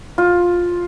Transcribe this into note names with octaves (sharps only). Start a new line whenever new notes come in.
F4